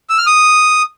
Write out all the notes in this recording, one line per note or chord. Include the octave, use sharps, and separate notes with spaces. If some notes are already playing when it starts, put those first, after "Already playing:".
E6
F6
D#6